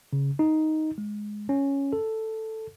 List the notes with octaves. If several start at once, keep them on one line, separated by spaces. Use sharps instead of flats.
C#3
D#4
G#3
C#4
A4